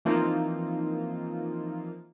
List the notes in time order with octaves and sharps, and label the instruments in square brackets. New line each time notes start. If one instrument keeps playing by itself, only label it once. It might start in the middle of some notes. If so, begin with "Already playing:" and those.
[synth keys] E3 F3 A#3 C4 D#4 F4